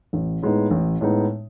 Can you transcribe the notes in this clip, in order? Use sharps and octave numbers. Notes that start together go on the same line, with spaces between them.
A1
A2 G#3 B3 D#4
A1
A2 G#3 B3 D#4